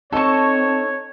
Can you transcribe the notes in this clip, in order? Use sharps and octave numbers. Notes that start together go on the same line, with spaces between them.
C4 D#4 A4 C#5 D#5 A5 C#6